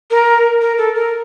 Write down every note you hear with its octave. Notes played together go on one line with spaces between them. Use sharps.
A#4
A#4
A4
A#4